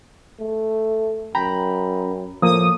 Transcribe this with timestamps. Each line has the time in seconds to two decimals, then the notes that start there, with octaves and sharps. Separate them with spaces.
0.40 A3
1.35 F#2 G5 A#5 B5
2.42 A2 F3 A#3 D#6